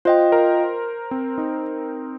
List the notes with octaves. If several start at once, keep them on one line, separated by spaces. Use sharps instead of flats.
F4 C5 D#5 G5
A#4
C4
D#4